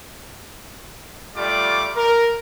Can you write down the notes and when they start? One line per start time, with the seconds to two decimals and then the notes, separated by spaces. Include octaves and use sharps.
1.37 G3 A3 F4 D5 D6
1.96 A#4